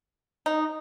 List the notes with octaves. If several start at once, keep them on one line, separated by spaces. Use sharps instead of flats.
D#4